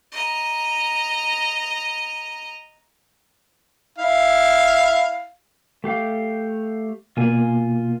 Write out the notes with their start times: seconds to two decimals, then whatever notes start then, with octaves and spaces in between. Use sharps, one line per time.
0.12 D#5 A#5
3.98 E4 F5
5.84 A3 G4 F5
7.17 B2 A#3 F4 G#5